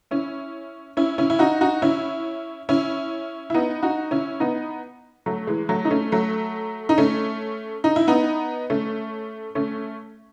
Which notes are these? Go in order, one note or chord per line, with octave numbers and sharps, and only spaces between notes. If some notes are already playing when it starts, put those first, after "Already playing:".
C#4 E4
C#4 E4
C#4 E4
E4
D#4 F#4
D#4 F#4
C#4 E4
C#4 E4
E4
B3 D#4
D#4 F#4
C#4 E4
B3 D#4
F#3 A3
E3 G#3
F#3 A3
D#4
A3 C#4
F#3 A3
D#4
A3 C#4
D#4
E4
B3 D#4
A3 C#4
A3 C#4